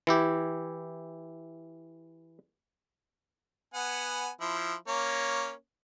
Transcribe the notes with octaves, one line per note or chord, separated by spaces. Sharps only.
E3 E4 G4
B3 F#5 G#5
F3 E4
A#3 C#4 C#5